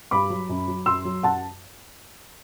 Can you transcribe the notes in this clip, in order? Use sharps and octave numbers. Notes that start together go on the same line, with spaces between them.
G2 B5 D6
F#3
F#2
F#3
F#2 C6 E6
F#3
F#2 F#5 A5